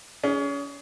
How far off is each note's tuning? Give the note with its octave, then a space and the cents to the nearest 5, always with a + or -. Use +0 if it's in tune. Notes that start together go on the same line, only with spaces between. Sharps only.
C#4 +30 G#4 +0